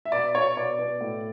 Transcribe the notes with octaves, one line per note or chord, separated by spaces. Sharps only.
E5
B2 D5
B2 C#5
B2 D5
B2
A2